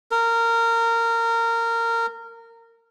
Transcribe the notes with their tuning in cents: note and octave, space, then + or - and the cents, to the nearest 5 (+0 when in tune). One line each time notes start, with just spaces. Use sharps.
A#4 -20